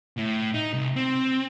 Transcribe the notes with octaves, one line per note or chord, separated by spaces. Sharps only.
A2
D#4
C2
C4